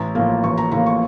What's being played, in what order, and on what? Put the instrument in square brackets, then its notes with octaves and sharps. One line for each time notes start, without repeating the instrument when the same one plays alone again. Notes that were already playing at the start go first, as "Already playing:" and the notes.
Already playing: [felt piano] A1 A#5
A2 F3 A#3
A1 C#6
A#5
A2 F3 A#3 A#5
C#6